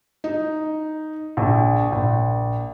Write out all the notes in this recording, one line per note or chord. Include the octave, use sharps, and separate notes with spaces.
D#4
A#1
A#1